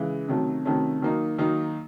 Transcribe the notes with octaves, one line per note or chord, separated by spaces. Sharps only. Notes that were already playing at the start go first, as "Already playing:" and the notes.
Already playing: C#3 E3 G#3
C3 D#3 F#3 A3 C#4
C3 D#3 F#3 A3 C#4
D#3 F#3 A#3 D#4
D#3 F#3 A#3 D#4